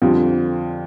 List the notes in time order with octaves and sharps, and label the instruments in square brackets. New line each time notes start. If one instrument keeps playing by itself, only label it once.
[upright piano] F2 D3 G3 C4 F4